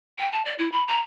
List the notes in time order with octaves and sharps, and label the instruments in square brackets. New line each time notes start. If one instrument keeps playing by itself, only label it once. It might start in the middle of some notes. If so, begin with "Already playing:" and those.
[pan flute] G5
A5
D5
E4
B5
A#5